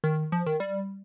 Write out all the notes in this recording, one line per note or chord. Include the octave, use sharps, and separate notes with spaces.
D#3
F3
D#3
G3